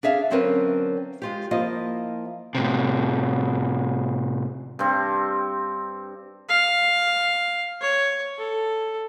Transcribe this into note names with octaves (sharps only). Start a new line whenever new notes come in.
D4 G#4 E5 F5
D3 F#3 C4 C#4 A#4 B4
G#3 F4 G4
F3 A#3 E4 F4 D#5
A2 C3
G2 C4
F5
C#5
A4